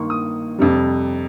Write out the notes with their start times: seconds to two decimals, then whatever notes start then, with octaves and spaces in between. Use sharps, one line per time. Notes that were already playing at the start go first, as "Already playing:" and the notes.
Already playing: G2 D#3 A#3 D#4 C6 C#6
0.10 D#6
0.59 F2 C3 G3